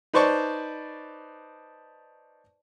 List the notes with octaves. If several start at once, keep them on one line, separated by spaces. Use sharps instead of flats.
D#4 B4 C5 D5 A5 C#6